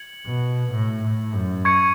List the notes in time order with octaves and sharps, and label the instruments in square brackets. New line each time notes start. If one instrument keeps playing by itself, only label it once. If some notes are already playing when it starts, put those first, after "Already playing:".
Already playing: [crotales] G#6 C#7 F#7
[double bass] B2
A2
A2
F#2
[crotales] C#6 G#6 C#7